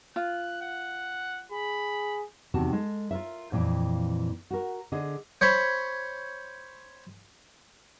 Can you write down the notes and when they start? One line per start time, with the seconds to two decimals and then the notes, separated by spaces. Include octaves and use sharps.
0.16 F4 F#6
0.61 F#5
1.52 G#4 B5
2.54 E2 C3 D#3 F#4 A5
2.73 G#3 A4
3.11 F4 A#4 E5
3.52 F2 A#2 E3 G5
4.50 F#4 A#4
4.92 D3 G#4 D#5
5.41 C5 C#5 B5